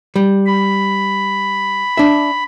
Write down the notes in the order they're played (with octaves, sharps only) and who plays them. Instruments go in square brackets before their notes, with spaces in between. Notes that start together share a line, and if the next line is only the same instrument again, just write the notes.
[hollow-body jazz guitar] G3
[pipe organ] B5
[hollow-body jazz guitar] D4 E5